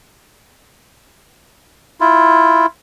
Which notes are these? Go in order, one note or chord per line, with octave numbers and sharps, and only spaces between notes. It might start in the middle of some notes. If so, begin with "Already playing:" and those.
E4 F4